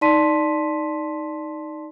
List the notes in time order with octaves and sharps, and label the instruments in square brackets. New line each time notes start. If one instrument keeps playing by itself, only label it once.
[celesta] D#4 D5 A5 C6 B6 D#7